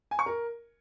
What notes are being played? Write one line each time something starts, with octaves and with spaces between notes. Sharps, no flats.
G#5
C#6
A#4